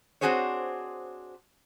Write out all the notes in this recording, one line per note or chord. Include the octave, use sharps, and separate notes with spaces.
C4 D4 F#4 G#4 C5 C#5